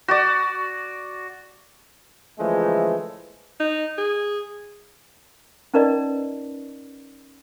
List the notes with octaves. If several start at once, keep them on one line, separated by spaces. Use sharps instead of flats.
F#4 D5
C#3 E3 F3 G#3 A3
D#4
G#4
C#4 D#4 A#4 B4 D5 D#5